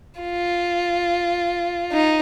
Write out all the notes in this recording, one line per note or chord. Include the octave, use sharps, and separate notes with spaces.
F4
D#4